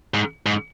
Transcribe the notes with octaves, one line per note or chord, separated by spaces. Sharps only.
G#2
G#2